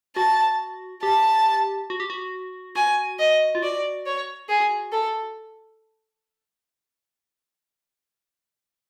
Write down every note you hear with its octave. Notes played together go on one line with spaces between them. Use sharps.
F#4 A5
G4 A5
F#4
G4
F#4
F#4 G#5
D#5
F4
F#4 D5
C#5
G#4
A4